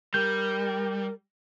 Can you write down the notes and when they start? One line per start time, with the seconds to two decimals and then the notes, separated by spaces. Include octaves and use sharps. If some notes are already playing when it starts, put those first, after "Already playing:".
0.14 G3 A#4 G6